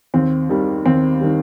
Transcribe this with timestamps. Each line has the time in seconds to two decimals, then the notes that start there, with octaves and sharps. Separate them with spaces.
0.14 D#2 C4
0.49 D#3 G3
0.86 D#2 C4
1.21 D#3 G3